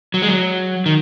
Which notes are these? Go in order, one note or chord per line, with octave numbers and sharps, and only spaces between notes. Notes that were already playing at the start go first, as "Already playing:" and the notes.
F#3
G#3
F#3
D#3